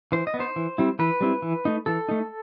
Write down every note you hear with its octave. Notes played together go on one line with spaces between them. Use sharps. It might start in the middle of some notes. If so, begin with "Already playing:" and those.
E3 C5
D#5
B3
D#4 C5
E3
G3 C4 E4
E3 B4
G3 C4 E4
E3
A3 D#4
E3 A4
A3 D#4